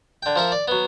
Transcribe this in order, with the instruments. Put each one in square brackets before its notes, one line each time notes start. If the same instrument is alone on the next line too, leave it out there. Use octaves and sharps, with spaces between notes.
[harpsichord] D3 G5
F3 A#4 E5
D5
F#3 B3